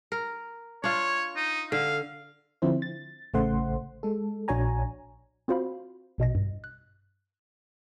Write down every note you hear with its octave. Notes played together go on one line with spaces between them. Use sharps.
A#4
D4 F4 C#5
D#4
D3 F5
D3 F3 C4 E4 C5
A6
A1 C#3 A3 C5 F#5 C6
G#3 A4
A#1 D4 F#4 C#5 G#5 A#5
C4 F4 F#4 C5 F5 B5
A#1 B2 D#5 A#6
G2
F#6